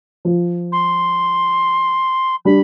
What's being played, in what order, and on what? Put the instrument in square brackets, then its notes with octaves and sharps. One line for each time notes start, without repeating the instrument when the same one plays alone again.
[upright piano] F3
[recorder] C6
[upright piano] G3 D4 [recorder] B5